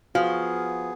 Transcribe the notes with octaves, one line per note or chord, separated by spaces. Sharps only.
F3 B3 F#4 G#4 F5